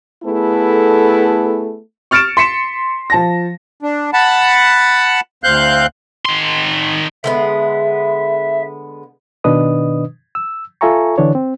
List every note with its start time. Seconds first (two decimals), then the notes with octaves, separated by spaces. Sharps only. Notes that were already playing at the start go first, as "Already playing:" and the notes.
0.24 A3 B3 E4 G#4 A4
2.11 C#6 F6 A6 C#7 D7 E7
2.37 C6 B6 C#7 E7
3.10 F3 A5 A#6
3.82 D4
4.13 F#5 A5 B5
5.44 D2 C4 F5 F#6 G6
6.26 D#3 C6
7.24 D3 G#3 B3 E5
9.44 B2 D#3 D4 B4 D#5 D#6
10.35 E6
10.81 F4 A4 E5 G#5 A#5 C#6
11.18 D3 E3 D4 C#5
11.35 C4